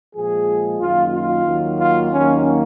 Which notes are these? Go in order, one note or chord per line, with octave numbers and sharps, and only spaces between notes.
A#2 F3 G#3 G#4
F#2 D#3 A#3 F4
F4
D#2 D#3 F#3 A#3
F4
D#2 D#3 F#3 A#3 C#4